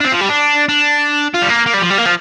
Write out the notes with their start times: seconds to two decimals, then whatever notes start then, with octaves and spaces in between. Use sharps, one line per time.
0.01 D4
0.05 C4
0.12 F3
0.21 G3
0.29 D4
0.69 D4
1.34 F4
1.42 G3
1.49 A#3
1.66 A#3
1.74 G3
1.81 F3
1.90 G3
1.98 A#3
2.06 F3